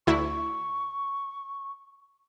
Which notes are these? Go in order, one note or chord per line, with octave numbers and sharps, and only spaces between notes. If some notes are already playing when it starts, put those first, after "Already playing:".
D2 E4 C#6